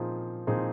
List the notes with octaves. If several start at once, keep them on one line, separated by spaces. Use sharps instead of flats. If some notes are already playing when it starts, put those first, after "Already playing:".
Already playing: A#2 F3 C4 D#4 G#4
A#2 F3 C4 D#4 G#4